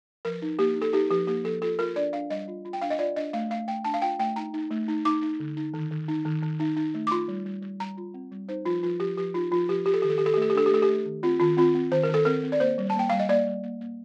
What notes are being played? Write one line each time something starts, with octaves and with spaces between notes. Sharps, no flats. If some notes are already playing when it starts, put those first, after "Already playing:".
F3 A#4
D#4
A#3 G4
D#4
A4
D#4 G4
F3 G4
A#3 G4
F3 A4
F4 A4
F4 A#4
D4 D5
D4 F5
G3 D#5
F4
F4
G5
D4 F5
D#5
F4 D5
D4 D#5
A3 F5
A3 F5
A3 G5
D4 A5
F5
F4 G5
A3 G5
D#4 A#5
D#4
A3
D#4
D#4 D6
D#4
D3
D#4
D#3
D#3
D#4
D#3
D#3
D#4
D#4
A3
D6
F4 C6
G3
G3
G3
G3 A#5
F4
C4
G3
D#4 C5
F3 F4
F3 F4
F3 G4
F3 G4
D#4 F4
F3 F4
F3 G4
F4 G4
A4
D#3 G4
A4
D#3 G4
A4
G4
A3 A4
G4
D4 A4
G4
A3 A4
G4
A3
D#3
C4 F4
D#3 F4
C4 F4
C4
D#3 C5
A#4
D#3 A4
C4 A#4
C4
D5
A#3 C5
G3
A5
A#3 G5
G3 F5
D#5
A#3 D5
G3
A#3
A#3